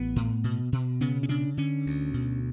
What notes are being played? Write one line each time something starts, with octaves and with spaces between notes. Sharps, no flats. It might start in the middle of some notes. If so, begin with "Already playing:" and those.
Already playing: A1 B3
A2
B2
B2
C#3 B3
C#4
C#3 D4
D3 C#4
D2
B2